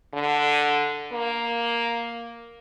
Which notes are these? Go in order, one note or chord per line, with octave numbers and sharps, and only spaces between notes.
D3
A#3